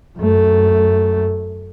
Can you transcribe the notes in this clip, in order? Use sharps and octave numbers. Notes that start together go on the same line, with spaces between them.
F#2 A3